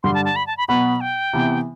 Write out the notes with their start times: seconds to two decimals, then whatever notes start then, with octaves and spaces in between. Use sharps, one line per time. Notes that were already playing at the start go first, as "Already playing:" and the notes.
0.03 G2 D3 G3 C6
0.14 A5
0.25 A5
0.36 B5
0.47 A5
0.57 B5
0.68 B2 F#3 B3 B5
1.01 G5
1.33 C3 E3 B3